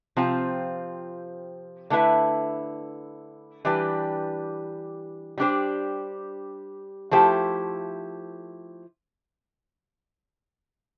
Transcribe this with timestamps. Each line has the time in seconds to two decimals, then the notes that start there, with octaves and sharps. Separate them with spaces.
0.16 C3 F3 C4 F4
1.90 D3 A3 E4 B4 E5
3.65 E3 G3 D4 G4 B4
5.38 G3 D4 G4 C5
7.11 F3 A3 E4 G4 C5